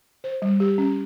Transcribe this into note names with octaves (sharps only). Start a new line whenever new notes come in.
C5
G3
G4
C#4